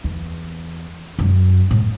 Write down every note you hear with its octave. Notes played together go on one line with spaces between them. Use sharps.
E2
F#2
A2